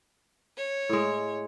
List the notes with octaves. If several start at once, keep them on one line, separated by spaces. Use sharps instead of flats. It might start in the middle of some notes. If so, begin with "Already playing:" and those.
C#5
A2 G#3